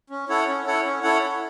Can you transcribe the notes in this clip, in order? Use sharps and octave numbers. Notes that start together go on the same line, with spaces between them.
C#4
E4 A4 C#5 F#5
C#4
E4 A4 C#5 F#5
C#4
E4 A4 C#5 F#5